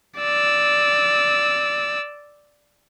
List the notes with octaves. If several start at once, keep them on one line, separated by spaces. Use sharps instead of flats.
D5 E6